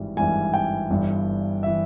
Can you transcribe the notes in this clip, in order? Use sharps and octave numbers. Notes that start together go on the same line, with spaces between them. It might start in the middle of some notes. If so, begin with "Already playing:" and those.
Already playing: G#1 G2 E3 G3
G#1 G2 E3 G3 G#5
G5
G1 G2 E3
E3 E5